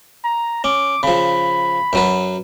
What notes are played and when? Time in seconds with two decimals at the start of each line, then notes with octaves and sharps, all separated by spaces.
0.24 A#5
0.64 C#4 D6
1.03 C#3 F3 B5
1.93 F#2 F#3 B4